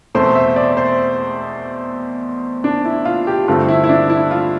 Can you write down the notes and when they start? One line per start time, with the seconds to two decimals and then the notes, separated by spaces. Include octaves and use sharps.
0.15 E2 B2 A3 C4 C5
0.35 E5
0.56 D5
0.77 C5
2.64 D4
2.85 E4
3.05 F4
3.27 G4
3.48 G2 D3 A3 C4 F4
3.68 E4
3.84 E4
3.89 D4
4.10 E4
4.31 F4